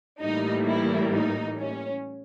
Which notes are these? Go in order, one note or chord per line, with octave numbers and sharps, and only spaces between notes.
A2 E3 G3 A#3 D#4
E4
D#4
C#4